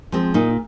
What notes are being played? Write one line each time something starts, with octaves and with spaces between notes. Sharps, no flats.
F3 G#3 C4
A#2 D#4